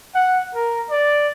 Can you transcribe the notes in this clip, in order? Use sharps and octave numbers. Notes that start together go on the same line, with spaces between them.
F#5
A#4
D5